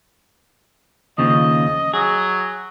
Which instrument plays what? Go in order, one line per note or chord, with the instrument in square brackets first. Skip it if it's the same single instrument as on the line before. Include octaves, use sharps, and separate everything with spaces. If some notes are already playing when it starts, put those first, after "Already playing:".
[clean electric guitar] D#2 C#3 F3 [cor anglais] D#5
[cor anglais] F#3 [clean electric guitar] G#4